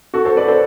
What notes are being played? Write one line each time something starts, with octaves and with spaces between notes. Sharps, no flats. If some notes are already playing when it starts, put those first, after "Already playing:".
F#4 A4
A4 C5
B4 D5
A4 C5